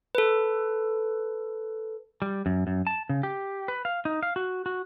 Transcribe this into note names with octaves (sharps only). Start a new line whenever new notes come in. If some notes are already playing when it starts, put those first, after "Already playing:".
A4 B4
G3
F#2
F#2
A5
C#3
G4
B4
F5
D#4
F5
F#4
F#4